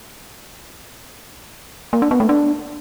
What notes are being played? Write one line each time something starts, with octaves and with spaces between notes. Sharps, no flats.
A#3
D4
B3
A3
D4